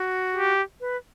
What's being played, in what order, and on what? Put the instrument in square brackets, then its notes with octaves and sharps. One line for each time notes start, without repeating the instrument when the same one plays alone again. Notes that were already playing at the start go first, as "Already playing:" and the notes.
Already playing: [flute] F#4
[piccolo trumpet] G4
[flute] B4